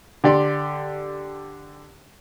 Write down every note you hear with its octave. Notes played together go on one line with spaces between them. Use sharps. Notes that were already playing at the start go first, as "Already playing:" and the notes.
D3 G4 D5 C6